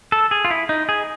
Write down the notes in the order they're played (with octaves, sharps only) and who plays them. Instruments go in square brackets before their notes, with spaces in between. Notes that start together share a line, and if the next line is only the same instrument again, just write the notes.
[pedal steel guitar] A4
G#4
F4
E4
D#4
G#4